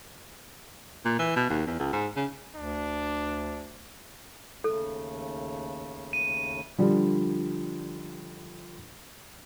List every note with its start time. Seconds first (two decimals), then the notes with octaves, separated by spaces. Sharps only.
1.05 A#2
1.19 E3
1.36 B2
1.50 D#2
1.67 E2
1.79 C#2
1.93 G#2
2.16 C#3
2.56 D2 D4
4.64 D#2 C#3 A3 A4
6.13 D#7
6.78 D3 F3 G3